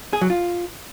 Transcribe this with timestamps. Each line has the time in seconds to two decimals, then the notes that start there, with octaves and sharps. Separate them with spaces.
0.13 G#4
0.21 F#3
0.30 F4